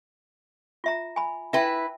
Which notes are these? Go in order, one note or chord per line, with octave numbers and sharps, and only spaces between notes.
F4 E5 A#5
G#5 B5
E4 B4 E5 G5 A5